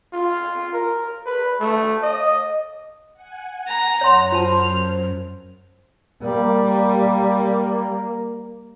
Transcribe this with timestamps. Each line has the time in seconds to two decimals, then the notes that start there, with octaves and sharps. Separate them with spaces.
0.13 F4
0.73 A#4
1.26 B4
1.60 A3
2.03 D#5
3.13 F#5 G#5
3.68 A#5
4.01 F#2 C#5 F#5 C6
4.32 F4 C5 A5 F6
6.24 G3 A#3